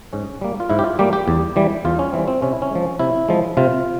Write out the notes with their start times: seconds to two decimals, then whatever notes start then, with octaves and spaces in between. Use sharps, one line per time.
0.13 G#2 C#4
0.41 G3 A#3
0.60 F4
0.70 G#2 E4
0.79 G4
0.84 F4
0.99 G3 A#3 G4
1.13 G4
1.28 E2
1.56 E3 G3
1.85 E2 F4
1.99 C#4
2.13 E3 G3 C4
2.28 C4
2.42 C3 C#4
2.52 E4
2.62 C#4
2.71 F3 G#3
2.99 C3 E4
3.29 F3 G#3
3.57 C3 F4